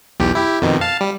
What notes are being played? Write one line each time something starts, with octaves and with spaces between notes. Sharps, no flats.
B1 E2 G4
E4 G4
F2 B2 D#3
F5 A5
G3